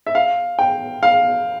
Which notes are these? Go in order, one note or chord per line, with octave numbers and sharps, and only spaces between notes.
E5
F5
G5
F5